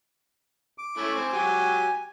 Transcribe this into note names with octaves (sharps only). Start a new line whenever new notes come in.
D6
A3 C#4 E4
C4 G#5
F#3 G4 G#5